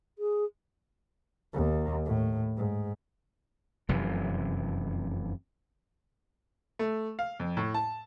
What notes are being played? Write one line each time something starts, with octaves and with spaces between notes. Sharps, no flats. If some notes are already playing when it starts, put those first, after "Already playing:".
G#4
D#2
A2
G#2
F1 F#2 C3 E3
A3
F5
F2
A2
A5